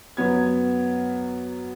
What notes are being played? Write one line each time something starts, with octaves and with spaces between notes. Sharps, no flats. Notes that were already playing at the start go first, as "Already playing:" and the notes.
F#2 F#3 B3 G#6